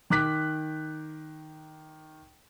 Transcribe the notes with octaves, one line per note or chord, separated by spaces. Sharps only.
D#3 D6 F#6 B6